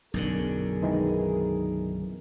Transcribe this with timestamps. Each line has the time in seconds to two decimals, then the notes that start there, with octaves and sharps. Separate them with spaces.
0.14 B1 F#2 D3 G#4 A#4
0.82 D#3 E3 G#3